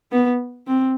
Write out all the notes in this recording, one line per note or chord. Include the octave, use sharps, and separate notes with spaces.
B3
C4